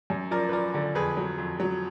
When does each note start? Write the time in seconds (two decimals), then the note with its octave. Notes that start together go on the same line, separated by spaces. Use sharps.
0.10 F#2
0.31 F3 A#4 D5
0.49 B4
0.53 F3 A#4 D5
0.74 D3
0.95 F2 G#4 B4
1.17 F#3
1.38 F2
1.60 F#3